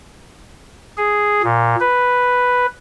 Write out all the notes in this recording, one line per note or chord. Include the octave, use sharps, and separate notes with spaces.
G#4
A#2
B4